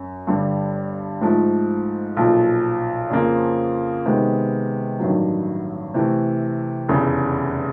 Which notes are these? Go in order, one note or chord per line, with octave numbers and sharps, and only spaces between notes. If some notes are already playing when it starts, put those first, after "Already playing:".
Already playing: F#2
G1 G2 D3 G3
G#2 F3 A3
B1 A#2 F3
F2 C#3 F3 A#3
C3 D#3 G#3 B3
A1 G2 D#3 F#3
C3 E3 A3
F1 E2 C#3